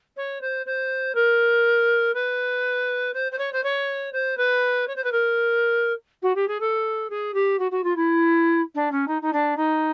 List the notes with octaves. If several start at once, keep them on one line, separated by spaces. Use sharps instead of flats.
C#5
C5
C5
A#4
B4
C5
C5
C#5
C5
C#5
C5
B4
C#5
C5
B4
A#4
F#4
G4
G#4
A4
G#4
G4
F#4
F#4
F4
E4
D4
C#4
D#4
D#4
D4
D#4